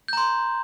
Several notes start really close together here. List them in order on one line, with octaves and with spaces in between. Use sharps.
G6 A#5 C6